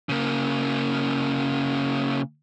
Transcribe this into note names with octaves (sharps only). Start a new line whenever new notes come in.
C#3 A#3